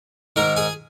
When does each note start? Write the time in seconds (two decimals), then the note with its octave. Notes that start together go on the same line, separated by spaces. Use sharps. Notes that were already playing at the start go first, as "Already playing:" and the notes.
0.36 G#2 D#3 A#4 A#5
0.57 G#4 G#5